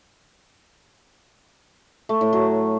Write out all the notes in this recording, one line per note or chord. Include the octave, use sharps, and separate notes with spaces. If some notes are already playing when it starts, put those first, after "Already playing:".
A3
A2
F#3